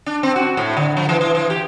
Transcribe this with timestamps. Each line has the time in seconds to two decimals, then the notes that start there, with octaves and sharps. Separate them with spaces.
0.06 D4
0.23 C4
0.36 F#4
0.57 A2
0.77 D3
0.97 F3
1.09 E3
1.21 E3
1.35 E3
1.50 G4